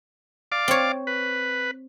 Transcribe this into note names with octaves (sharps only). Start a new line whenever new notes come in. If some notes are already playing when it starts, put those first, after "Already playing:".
D5 F5 D6
C4 C#5
B4